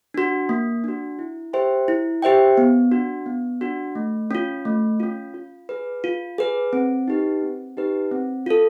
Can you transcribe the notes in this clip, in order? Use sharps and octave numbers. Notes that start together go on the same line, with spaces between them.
D4 F#4
A#3
D4 F#4
E4
G4 C5 E5 G5
E4
G4 C5 E5 G5
B3
D4 F#4
B3
D4 F#4
A3
C#4 F4
A3
C#4 F4
F4
G#4 B4
F4
G#4 B4
C4
D#4 G4 B4
C4
D#4 G4 B4
C4
F4 A4